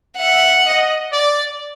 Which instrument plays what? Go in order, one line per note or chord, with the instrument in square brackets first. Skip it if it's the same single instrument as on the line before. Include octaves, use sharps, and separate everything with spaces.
[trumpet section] E5 [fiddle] F#5
[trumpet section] D#5
D5